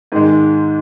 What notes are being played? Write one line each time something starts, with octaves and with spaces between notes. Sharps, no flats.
G#2 D#3 G#3